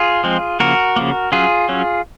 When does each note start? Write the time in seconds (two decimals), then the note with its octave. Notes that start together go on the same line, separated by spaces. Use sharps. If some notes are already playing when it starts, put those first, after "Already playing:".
Already playing: F4 G#4
0.24 F3 G#3 C4
0.60 C#3 F3 A#3 F#4 A#4
0.96 C#3 F3 A#3
1.32 F#3 C#4 F4 G#4
1.69 F#3 C#4